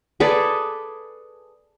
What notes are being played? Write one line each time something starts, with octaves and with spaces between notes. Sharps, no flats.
G#4 A4 B4 D5